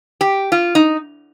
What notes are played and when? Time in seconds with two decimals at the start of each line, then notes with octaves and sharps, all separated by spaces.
0.21 G4
0.52 F4
0.75 D#4